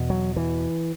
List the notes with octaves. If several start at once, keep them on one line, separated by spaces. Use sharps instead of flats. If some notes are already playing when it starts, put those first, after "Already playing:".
Already playing: E2 B2
F#3
E3